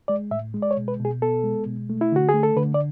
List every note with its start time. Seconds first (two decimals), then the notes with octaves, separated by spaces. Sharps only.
0.08 G#3 D5
0.31 A2 E5
0.54 G#3
0.62 D5
0.71 C#5
0.77 B2
0.88 B4
0.99 B2
1.05 G#4
1.22 B3 A4
1.44 G#3
1.67 B2
1.90 A3
2.01 E4
2.12 D3 F#4
2.29 G#4
2.34 A3
2.43 A4
2.57 D3 B4
2.74 D5